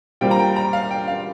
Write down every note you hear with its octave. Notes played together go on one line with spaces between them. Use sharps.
A#2 G3 C4 F4 G5
A#5
G5
A#5
F5
G5
F5